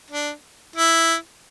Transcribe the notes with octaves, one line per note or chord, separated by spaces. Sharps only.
D4
E4